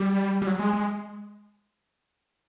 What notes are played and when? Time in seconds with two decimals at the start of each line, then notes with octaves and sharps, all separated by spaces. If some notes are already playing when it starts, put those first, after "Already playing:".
Already playing: G3
0.42 G3
0.47 F#3
0.59 G#3
0.73 G#3